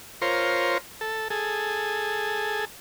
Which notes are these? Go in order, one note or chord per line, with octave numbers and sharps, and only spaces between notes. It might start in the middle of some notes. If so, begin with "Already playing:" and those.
F4 A#4 C5 C#5
A4
G#4 A4